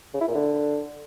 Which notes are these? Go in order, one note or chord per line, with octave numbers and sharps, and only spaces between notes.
C#3
E4
A#2
D3